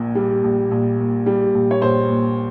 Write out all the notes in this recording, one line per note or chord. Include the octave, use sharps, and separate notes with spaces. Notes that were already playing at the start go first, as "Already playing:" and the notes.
Already playing: A#1 A#2
G3
A#1
A#1
A#2
G3
A#1
C#5
A#1 C5
A#2